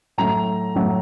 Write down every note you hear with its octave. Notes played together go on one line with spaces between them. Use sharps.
A2 F#3 A3 A#5
A2 F#3 A3